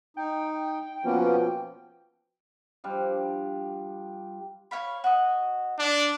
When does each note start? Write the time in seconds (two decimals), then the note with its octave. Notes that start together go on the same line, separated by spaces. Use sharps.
0.17 D#4 G5
1.04 B2 F3 A#3 B3 C#4
2.84 F3 G3 D4
4.71 C#5 F5 B5
5.04 F#4 D#5
5.79 D4